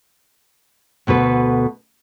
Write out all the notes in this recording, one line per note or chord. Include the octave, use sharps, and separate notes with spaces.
D2 B2 A4 B4